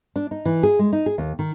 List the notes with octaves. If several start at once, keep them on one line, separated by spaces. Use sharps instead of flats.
D4
D#4
E3
G#4
G#3
D#4
G#4
D#2
D#3